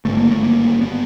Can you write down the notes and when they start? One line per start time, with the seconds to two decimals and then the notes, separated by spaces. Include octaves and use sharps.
0.05 G#1 G2 D3 A3
0.17 A#3
0.30 A3
0.42 A#3
0.81 B3